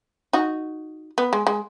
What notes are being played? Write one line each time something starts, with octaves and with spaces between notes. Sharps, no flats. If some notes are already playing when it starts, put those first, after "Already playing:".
D#4 F#4
B3
G#3
G#3